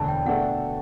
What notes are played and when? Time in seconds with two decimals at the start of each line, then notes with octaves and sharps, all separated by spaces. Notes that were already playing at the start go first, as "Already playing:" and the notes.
Already playing: E1 D2 D3 A5
0.08 G5
0.25 B2 A3 D4 A4 F#5